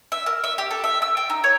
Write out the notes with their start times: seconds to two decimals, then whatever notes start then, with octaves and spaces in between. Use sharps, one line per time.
0.12 E5
0.26 A#4
0.44 E5
0.58 G4
0.71 A4
0.84 E5
1.02 E6
1.17 G5
1.30 D#4
1.44 C#5